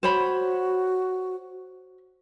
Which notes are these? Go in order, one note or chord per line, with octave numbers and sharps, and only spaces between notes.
F#4 C5 C#5 B5